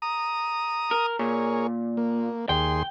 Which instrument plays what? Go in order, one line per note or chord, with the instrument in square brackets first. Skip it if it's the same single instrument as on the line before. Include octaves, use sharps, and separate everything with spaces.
[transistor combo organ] A#5 D#6
[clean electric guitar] A#4
[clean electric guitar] A#2 [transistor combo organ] G#4 A#4 C#5
[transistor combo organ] A#3
[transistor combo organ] D#2 G#4 C6 [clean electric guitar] G5